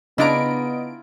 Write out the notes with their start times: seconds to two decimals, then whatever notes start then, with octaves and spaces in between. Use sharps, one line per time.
0.18 C#3 B3 D4 E4 F4 D#5 A#5 D7